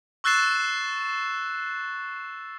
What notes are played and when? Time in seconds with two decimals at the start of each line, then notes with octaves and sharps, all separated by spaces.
0.24 C#6 E6 F#6 A6 C7 E7